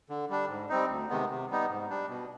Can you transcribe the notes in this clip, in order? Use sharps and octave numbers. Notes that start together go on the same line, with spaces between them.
D3
G3 D4
G#2
G3 C4 D#4
D2
C3 D#3 G#3 B3
C3
G3 B3 D#4
G#2
G3 D4
B2